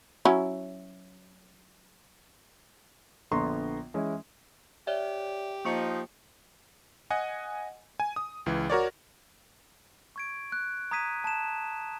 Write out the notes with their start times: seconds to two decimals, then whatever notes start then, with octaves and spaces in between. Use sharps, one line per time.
0.25 F#3 C#4 E4
3.31 A#1 D3 B3 A#5 C6 C#6
3.94 E3 G#3 C#4 E4
4.87 G4 C#5 D5 E5
5.65 F3 A#3 D#4 C#6 C#7
7.10 D#5 F#5 G#5
8.00 G#5
8.16 D#6
8.46 C#2 E3
8.70 F#4 A#4 C#5 D5
10.16 C#6 G#6 D7
10.52 F#6
10.91 A#5 D#6 G#6 B6 D#7
11.24 A5 E7